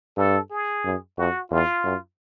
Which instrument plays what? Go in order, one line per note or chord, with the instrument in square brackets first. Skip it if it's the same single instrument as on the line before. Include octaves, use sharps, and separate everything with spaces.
[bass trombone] G2 [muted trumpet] A4
[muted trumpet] G#4
[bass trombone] F#2
[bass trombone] F2 [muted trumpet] F#4
[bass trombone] E2 [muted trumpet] F4
[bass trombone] F#2